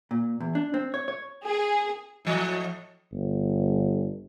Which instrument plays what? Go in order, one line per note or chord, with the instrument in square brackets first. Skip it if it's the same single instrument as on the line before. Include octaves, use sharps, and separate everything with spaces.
[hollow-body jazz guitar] A#2
E2
D4
C4
C#5
C#5
[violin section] G#4
[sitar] A2 F3 D#5
[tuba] G1